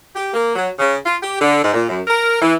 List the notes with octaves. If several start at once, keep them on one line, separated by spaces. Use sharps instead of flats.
G4
A#3
F#3
C#3
F4
G4
D3
G#2
A#2
F#2
A#4
E3